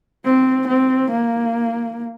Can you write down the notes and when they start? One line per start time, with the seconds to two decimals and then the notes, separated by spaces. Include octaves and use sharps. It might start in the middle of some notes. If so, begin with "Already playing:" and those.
0.25 C4
0.68 C4
1.11 A#3